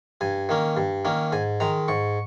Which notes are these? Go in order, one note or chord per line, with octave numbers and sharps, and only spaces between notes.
G2 G#5
D#3 A#3 C#4
G2
D#3 A#3 C#4
G#2 G#5
D#3 G#3 A#5
G#2 C#6